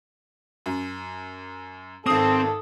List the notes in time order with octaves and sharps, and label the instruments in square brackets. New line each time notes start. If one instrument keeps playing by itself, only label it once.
[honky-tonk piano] F#2
[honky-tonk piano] G#1 D#6 [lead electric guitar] C4 [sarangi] A4